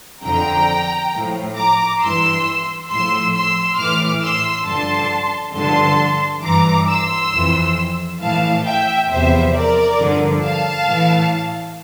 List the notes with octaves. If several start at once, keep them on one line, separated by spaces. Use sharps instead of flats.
F2 D3 F3 G5 A#5
A2 F3
A#5 D6
G2 E3 C6 E6
A2 F3 C6 E6
C6 E6
A2 E3 D6 F6
C6 E6
G2 D3 F3 A5 C6
G2 D3 F3 A5 C6
G2 E3 A#5 D6
C6 E6
F2 E3
A2 E3 F5 A5
E5 G5
E2 C3 F3 C5 E5
A#4 D5
G2 D3 F3
F5 A5
A2 E3